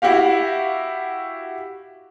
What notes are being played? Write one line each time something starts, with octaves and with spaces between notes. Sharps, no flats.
E4 F#4 G4 F5